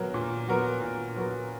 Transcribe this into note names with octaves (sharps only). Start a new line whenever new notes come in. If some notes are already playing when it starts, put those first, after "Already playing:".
Already playing: A#2 F#3 B3 F#4 A#4
A#2
F#3 B3 F#4 A#4
A#2
F#3 B3 F#4 A#4